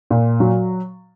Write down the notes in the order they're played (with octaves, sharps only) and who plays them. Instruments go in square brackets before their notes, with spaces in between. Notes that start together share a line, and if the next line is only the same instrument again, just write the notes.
[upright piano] A#2
F#3